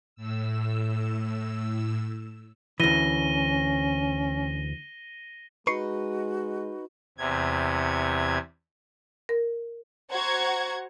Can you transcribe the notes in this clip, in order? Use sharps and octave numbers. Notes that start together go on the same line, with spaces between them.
A2 E6
D2 E3 C#4 A#6 D#7 G7
G#3 D#4 F#4 B4 C#6 C7 C#7
E2 C3 G#6
A#4
F#4 C5 F#5 A#5 C#6 G#6